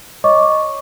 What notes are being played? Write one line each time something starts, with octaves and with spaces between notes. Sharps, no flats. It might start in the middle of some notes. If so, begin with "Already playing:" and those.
C#5 D#5 C#6 D6